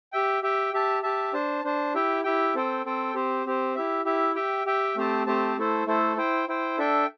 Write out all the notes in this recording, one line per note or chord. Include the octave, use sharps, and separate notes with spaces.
G4 E5 G5
G4 E5 G5
G4 E5 A5
G4 E5 A5
D4 C5 A5
D4 C5 A5
E4 G4 E5 G5
E4 G4 E5 G5
C4 A4 C5 G5
C4 A4 C5 G5
C4 G4 C5
C4 G4 C5
E4 G4 E5
E4 G4 E5
G4 E5 G5
G4 E5 G5
A3 C4 G4 C5 A5
A3 C4 G4 C5 A5
A3 E4 A4 C5
A3 E4 A4 C5
E4 C5 G5
E4 C5 G5
D4 A4 E5 G5